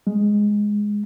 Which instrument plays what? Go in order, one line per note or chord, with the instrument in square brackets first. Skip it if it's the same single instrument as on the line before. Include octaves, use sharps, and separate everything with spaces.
[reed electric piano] G#3